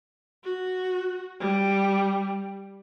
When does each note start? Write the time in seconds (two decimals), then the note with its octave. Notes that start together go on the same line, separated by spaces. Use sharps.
0.44 F#4
1.40 G3